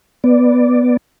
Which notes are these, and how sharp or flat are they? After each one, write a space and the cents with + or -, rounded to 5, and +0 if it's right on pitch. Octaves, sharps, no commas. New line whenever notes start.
B3 +0 D5 +0